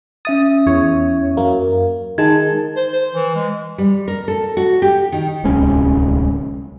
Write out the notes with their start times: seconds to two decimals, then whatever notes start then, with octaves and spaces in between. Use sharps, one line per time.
0.25 C#4 E5 D#6 A6
0.66 E2 C#5
1.37 F#2 A#3
2.18 D#3 G#3 A5 G#6
2.76 C5
2.93 C5
3.14 E3
3.36 G#3
3.78 G3
4.08 A#4
4.28 A4
4.57 F#4
4.82 G4
5.12 D#3
5.44 D1 C2 G#3 C#4